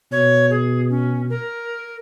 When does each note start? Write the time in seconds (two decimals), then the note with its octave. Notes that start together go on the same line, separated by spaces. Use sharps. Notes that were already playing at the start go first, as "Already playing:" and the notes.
0.12 B2 C#5
0.51 G#4
0.90 C#4
1.30 A#4